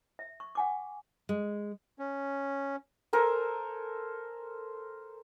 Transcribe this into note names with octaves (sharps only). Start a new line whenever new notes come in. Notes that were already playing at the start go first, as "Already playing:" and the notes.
E5
C#6
F#5 G#5 D6
G#3
C#4
A4 A#4 C5 G#5